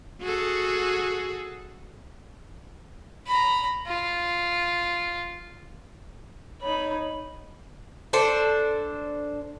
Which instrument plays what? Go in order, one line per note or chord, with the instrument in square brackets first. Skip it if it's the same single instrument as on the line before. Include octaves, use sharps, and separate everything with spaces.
[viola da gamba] F#4 G#4 A4
[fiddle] A#5 B5
F4
[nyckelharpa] D#4 B5 [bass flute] C#5
[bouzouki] D4 A4 C5